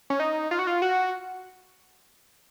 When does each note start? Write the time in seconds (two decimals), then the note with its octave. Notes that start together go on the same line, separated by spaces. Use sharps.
0.10 C#4
0.20 D#4
0.51 F4
0.59 F#4
0.67 F4
0.82 F#4